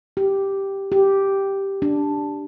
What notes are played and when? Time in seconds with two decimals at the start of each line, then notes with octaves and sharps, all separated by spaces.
0.17 G4
0.92 G4
1.82 D4